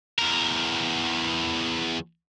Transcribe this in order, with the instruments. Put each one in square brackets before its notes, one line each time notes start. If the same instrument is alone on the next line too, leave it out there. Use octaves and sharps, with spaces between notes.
[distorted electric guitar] E2 A#4